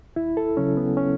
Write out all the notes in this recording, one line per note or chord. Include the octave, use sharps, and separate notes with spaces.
D#2 E4
A4
C#3 F#3 C#4
B3
C#4